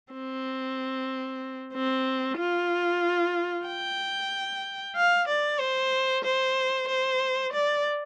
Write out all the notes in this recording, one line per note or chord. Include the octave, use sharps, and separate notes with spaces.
C4
C4
F4
G5
F5
D5
C5
C5
C5
D5